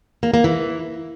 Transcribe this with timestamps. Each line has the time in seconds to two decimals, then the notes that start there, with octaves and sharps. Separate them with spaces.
0.23 A#3
0.34 A#3
0.44 E3